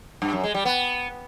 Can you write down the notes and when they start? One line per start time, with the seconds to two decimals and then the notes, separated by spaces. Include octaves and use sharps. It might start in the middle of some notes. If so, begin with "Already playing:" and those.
0.22 G2
0.33 F#2
0.44 G#3
0.54 G3
0.65 B3